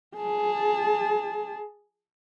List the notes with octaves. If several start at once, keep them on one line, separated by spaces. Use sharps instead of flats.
G#4 A5